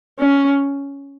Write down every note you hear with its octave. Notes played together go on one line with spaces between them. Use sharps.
C#4